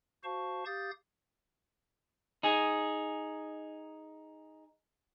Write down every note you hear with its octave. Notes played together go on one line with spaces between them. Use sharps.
F#4 C5 F5 A5 C#6
G4 F5 D#6 G6 A6
D#4 G#4